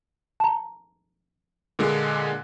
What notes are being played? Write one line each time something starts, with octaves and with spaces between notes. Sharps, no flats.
A5 A#5
A#2 D3 G#3